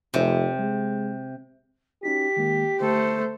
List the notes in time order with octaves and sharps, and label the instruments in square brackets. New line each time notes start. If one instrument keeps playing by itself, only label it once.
[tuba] F1 [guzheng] C3
[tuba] G#3
[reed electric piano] C#4 D#4 F#4 [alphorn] G4 [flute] B6
[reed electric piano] D#3 G#3 A#3
[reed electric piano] D3 [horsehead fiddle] A3 C5 [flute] A4